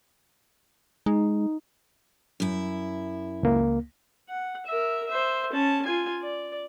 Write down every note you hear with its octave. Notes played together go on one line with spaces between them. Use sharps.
G#3 D#4
F#2 E4
C#2 A#3
F#5
A#4 E5
C5 E5
C#4 A5
F4 G#5
D5